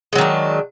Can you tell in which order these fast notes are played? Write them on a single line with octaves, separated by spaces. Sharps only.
G#3 F#3 D#3 D4